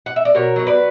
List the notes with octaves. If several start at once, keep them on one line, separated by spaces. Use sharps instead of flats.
F#5
E5
D5
B2 A#4 C#5
F#3 C#5
B4 D5